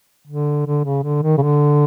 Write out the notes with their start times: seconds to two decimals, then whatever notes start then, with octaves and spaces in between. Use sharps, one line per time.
0.27 D3
0.66 D3
0.85 C#3
1.03 D3
1.23 D#3
1.38 C#3
1.42 D3